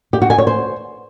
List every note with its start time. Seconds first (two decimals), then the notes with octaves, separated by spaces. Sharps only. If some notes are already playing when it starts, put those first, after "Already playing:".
0.13 G4
0.22 F#4
0.30 G#5
0.38 C#5
0.47 C5